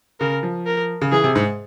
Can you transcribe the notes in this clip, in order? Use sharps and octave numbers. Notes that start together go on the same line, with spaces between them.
C#3 A#4
F3
A#4
C#3
E3 G#4
C3
G#2